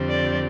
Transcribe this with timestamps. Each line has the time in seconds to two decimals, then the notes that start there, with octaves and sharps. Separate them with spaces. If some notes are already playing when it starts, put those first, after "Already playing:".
Already playing: F2 D3 G3 C4
0.09 D5